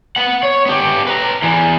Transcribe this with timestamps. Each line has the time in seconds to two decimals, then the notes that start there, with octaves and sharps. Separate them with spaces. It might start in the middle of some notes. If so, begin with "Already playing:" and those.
0.16 B3 F#5
0.43 C#5
0.66 B3 G4
1.07 B4 A#5
1.42 E2 E3